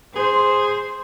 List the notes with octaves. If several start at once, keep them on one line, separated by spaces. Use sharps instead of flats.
G#4 C5